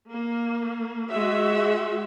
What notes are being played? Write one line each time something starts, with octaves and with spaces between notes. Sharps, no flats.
A#3
G#3 F#4 E5